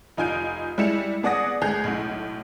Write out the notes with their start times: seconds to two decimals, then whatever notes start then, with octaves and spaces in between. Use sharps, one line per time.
0.17 F1 D#4 F4 G#5 G6 D7
0.78 G3 G#3 E4 C#7 E7 F7
1.23 B3 G#4 D5 F#5 D#6 A#6
1.62 C#2 A3 G#4 F#6 G6 F7
1.84 B1 A2